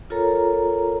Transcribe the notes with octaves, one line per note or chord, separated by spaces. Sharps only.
F4 A4 A#4 C#5 A#5